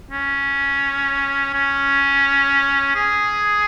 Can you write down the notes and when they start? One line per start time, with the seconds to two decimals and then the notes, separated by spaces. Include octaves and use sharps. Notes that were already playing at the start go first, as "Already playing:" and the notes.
0.11 C#4
1.54 C#4
2.95 G#4